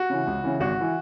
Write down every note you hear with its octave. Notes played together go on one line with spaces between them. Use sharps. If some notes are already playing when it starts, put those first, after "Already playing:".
Already playing: F#4
C#3 E3
C#2
C#3 E3
G#1 F#4
E3